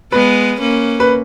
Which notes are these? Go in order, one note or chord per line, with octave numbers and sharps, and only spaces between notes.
G#3 B3 B4
A#3 C#4
B4